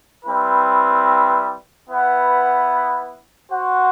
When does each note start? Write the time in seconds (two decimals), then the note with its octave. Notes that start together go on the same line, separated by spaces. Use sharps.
0.25 G3 C4 E4 B4
1.88 B3 E4 B4 F#5
3.51 F#4 C5 F#5